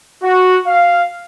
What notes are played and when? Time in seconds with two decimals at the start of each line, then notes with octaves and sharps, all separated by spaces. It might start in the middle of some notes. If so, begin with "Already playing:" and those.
0.23 F#4
0.68 F5